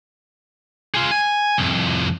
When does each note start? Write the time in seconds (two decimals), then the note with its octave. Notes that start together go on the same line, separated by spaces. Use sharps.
0.95 F4 G#4
1.11 G#5
1.58 C2 F2